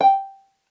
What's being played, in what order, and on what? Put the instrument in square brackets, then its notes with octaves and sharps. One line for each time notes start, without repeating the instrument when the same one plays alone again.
[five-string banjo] G5